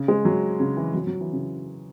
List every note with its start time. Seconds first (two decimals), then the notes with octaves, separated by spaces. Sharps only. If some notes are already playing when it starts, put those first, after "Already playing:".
Already playing: C#3
0.08 G#3
0.25 F#3
0.60 C#3
0.77 E3
0.94 F#3
1.07 F#3
1.21 E3
1.33 C#3